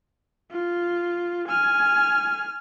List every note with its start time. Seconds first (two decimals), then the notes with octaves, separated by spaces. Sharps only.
0.51 F4
1.48 G#5 F6